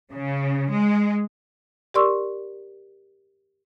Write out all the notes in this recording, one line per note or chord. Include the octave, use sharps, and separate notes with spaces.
C#3
G#3
G4 A#4 D5 C6 C#6 E6